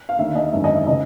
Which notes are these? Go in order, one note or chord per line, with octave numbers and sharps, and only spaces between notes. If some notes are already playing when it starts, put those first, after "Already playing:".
F5
D#2 D3 E5
D#5
G#1 F#2 D3 E5
D#5
E5
C#3 E3 D#5